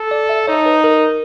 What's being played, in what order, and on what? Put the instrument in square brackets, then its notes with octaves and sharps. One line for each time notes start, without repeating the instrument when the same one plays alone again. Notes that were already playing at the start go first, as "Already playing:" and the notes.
Already playing: [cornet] A4
[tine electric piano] D5
E5
[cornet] D#4 [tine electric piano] C#5
[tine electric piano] B4
A#4